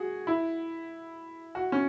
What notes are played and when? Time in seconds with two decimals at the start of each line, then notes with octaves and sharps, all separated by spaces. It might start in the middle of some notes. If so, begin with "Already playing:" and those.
Already playing: F#4 G#4
0.27 E4
1.55 F#4
1.72 C#4